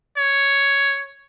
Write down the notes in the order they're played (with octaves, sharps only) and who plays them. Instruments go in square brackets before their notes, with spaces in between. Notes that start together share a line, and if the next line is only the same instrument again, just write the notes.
[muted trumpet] C#5